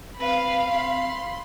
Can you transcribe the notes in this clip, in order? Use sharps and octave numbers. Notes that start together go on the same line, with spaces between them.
C4 B4 F5 B5
C6